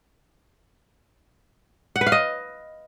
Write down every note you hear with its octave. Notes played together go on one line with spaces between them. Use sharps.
F#5
B4
F5
D#5